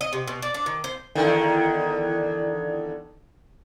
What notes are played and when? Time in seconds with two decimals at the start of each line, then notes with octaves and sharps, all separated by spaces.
0.01 D#5
0.13 C3
0.28 B2
0.42 D5
0.54 D4
0.66 D#3
0.84 C5
1.15 E2 D3 D#3